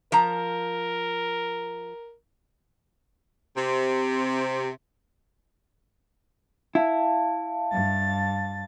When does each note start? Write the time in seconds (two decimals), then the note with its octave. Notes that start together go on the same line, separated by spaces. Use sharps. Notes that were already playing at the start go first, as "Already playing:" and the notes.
0.12 F3 A#4 A#5
3.56 C3
6.75 E4 F5 A5
7.72 G2 A6